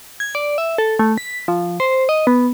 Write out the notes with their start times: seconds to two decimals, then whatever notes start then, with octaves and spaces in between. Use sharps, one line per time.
0.20 G#6
0.35 D5
0.58 E5
0.78 A4
0.99 A3
1.18 B6
1.48 F3
1.80 C5
2.09 D#5
2.27 B3